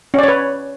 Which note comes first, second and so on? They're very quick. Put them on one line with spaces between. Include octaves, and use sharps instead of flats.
C#4 D5 C#5 B4